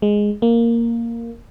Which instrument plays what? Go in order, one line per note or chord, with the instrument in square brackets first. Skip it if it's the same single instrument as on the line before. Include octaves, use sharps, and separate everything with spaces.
[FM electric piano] G#3
A#3